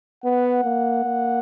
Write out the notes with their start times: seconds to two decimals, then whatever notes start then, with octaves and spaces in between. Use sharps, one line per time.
0.24 B3 F#5
0.64 A#3
1.04 A#3